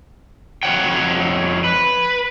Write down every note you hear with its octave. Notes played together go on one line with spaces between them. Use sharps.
F2 C#5 F#5 G5
B4